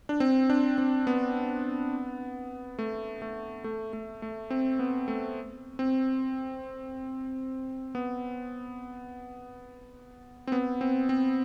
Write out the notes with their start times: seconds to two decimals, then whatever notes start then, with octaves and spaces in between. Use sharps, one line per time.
0.09 D4
0.20 C4
0.50 D4
0.78 C4
1.07 B3
2.79 A3
3.22 A3
3.64 A3
3.93 A3
4.22 A3
4.50 C4
4.79 B3
5.08 A3
5.79 C4
7.95 B3
10.47 C4
10.52 B3
10.81 C4
11.09 C4